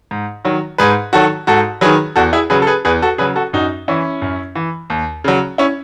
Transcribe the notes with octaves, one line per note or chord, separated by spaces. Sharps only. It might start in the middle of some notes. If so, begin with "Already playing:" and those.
G#2
D#3 F#3
G#2 G#4 B4
D#3 F#3 F#4 A4
G#2 F#4 A4
D#3 F#3 G#4 B4
E2 F#4 A4
E4 G#4
C#3 F#3 G#4 B4
A4
G#4 B4
E2 G#4 B4
F#4 A4
C#3 F#3 G#4 B4
F#4 A4
F#2 D#4 F#4
E3 C#4 E4
F#2
E3
D#2
C#3 F#3
C#4 E4